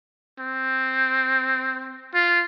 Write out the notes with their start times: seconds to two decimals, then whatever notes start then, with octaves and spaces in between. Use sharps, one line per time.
0.40 C4
2.15 F4